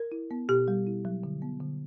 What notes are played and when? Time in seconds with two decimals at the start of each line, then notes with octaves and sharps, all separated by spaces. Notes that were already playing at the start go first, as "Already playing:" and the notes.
Already playing: A#4
0.12 E4
0.31 B3
0.49 B2 G4
0.68 G3
0.87 E4
1.05 F#3
1.23 D3
1.42 B3
1.60 D3